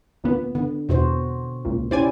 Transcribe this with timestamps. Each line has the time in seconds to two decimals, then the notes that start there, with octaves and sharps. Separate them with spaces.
0.24 D2 A#2 B3
0.55 D3 B3
0.89 E2 B2 F#4 C5
1.65 C#2 A#2
1.91 C#4 E4 G4 C5 D5 G#5